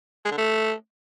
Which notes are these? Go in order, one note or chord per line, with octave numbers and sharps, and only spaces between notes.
G#3
D3
A3